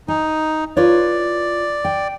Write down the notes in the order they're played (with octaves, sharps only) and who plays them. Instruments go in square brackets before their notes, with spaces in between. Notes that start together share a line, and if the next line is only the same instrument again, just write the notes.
[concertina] D#4 [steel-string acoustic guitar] G#5
[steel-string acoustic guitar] F4 B4 C#5 [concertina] D5
[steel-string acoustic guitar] G5